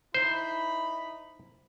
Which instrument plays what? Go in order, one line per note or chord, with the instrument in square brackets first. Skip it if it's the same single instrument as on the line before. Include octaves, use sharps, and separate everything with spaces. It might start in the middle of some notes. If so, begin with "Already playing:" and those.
[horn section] D#4 E4 B5 [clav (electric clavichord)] C5